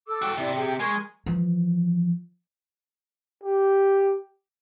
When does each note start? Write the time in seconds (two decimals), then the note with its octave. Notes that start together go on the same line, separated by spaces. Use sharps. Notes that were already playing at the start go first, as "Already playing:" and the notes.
0.07 A4 D6 E6
0.22 F#4 G5
0.37 C3 E4 D5
0.56 G4 G#4 G5
0.80 G#3 A#4 C#6 G#6
1.26 E3 F3
3.43 G4